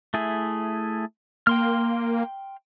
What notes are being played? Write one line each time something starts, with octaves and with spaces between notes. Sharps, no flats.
A3 E4 G#4
A#3 G5 C6 F6